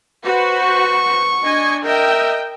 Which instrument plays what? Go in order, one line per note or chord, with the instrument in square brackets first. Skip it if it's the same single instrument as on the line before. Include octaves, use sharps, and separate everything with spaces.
[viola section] F#4 B4 C5
[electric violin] C#6
[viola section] D4 D#5 G#5
[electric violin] A#4 E5 [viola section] D#5 G5